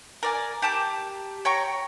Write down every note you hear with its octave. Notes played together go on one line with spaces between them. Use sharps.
A#4 D5 G#5
G4 A5 D6 G6
C#5 G5 A#5 C#6